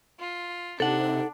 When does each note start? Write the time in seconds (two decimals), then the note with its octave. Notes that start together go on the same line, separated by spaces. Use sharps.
0.20 F4
0.80 C3 D4 D#4 A4 F#5